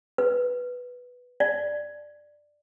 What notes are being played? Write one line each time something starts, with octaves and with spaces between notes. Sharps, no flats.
B4
D5